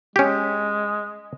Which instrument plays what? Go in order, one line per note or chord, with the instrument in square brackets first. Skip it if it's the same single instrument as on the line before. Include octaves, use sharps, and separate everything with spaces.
[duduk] G#3 [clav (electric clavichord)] C#4 G4